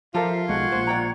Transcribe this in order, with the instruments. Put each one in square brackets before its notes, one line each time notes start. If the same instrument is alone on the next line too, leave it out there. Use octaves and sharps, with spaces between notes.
[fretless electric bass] F3 [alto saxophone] F4 [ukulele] G4 A4 A#4 [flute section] E5 F5
[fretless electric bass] B1 G#3 [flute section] F#5 C#6 G#6
[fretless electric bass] A#1 [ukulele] C5
[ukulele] D5 G5 A#5